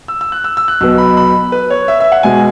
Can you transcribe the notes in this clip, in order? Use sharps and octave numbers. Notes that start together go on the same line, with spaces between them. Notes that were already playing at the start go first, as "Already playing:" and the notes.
E6
E6
F#6
E6
E6
F#6
B1 B2 B3 E6
B5
B5
B4
C#5
E5
E5
F#5
B2 G#3 G#5